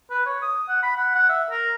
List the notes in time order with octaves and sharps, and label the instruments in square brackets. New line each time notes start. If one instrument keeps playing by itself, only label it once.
[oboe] B4
C#5
D#6
F#5
B5
F#5
F#5
E5
A#4